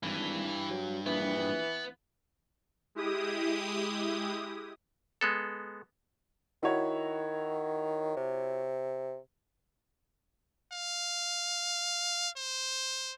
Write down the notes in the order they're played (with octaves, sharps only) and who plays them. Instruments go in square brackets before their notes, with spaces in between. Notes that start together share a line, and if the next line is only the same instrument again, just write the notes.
[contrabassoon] G#1 [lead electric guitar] G2 [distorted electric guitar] E3
[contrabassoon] F#3
[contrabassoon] A#1 [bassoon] E3 [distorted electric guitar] B3
[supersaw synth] G#3 E4 G4 D#6
[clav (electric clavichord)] G#3 B3 A4
[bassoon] D#3 [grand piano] E4 F#4 C#5
[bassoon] C3
[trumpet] F5
C5